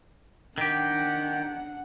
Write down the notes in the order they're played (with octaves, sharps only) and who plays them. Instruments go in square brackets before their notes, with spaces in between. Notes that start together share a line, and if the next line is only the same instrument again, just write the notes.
[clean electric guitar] D#3 G4 [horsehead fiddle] D4 F#5